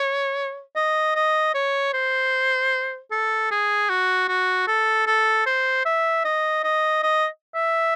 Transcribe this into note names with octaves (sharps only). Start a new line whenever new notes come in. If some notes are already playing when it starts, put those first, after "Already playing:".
Already playing: C#5
D#5
D#5
C#5
C5
A4
G#4
F#4
F#4
A4
A4
C5
E5
D#5
D#5
D#5
E5